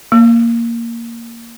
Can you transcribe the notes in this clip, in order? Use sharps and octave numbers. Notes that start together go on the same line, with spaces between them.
A#3